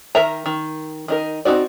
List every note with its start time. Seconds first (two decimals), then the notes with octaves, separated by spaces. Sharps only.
0.15 D#3 A#4 E5 A#5
0.46 D#3
1.08 D#3 D#4 A#4
1.45 C4 C#4 D#4 F#4 D5